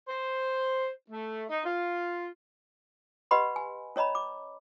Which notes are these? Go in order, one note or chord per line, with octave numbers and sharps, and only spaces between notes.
C5
A3
D#4
F4
G4 B4 D#5 F#5 B5 C6
G#5
C#4 C#5 D#5 A#5 B5
D6